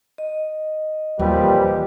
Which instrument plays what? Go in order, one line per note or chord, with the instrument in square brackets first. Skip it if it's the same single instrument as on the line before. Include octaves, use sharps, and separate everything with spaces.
[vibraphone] D#5
[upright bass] D#2 E3 [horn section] A#2 F3 G3 [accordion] C4 G4 B4